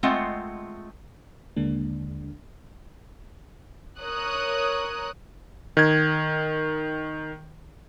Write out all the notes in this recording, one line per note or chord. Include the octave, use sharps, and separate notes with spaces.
G#3 A3 C4 F4 D#5 F#5
D#2 D3 G#3 A#3 D4
A#4 C#5 D#6 F#6
D#3 G#6